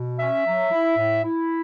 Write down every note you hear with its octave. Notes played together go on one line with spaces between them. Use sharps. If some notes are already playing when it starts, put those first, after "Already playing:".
Already playing: B2
C#4 E5
F#3
E4
A2
E4